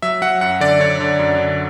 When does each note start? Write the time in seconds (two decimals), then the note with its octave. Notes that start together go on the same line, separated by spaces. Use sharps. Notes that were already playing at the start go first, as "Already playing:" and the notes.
0.02 F#3 E5
0.22 F#3 F#5
0.41 F#2 F#5
0.60 D3 D5
0.80 D3 C#5
1.00 D3
1.19 F#2
1.38 D3